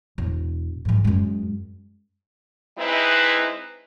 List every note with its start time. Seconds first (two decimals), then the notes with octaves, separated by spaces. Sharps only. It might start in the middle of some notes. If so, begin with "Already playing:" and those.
0.18 E1
0.85 G#2 E3
1.04 F#2 G#3
2.78 G#3 C4 D#4 E4 B4